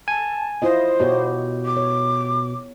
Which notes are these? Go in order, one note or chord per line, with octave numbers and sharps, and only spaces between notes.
G#5 A5
E4 F4 C5 D#5
B2 B3 G4 C#5
D6
C#5